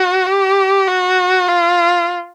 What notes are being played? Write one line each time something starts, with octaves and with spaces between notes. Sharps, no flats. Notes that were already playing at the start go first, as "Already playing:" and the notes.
Already playing: F#4
G4
F#4
F4